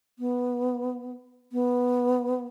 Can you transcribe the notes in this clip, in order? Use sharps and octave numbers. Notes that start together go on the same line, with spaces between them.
B3
B3